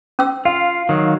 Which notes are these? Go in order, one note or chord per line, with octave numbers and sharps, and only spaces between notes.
C#4 E6
F4 F5
D#3 F#3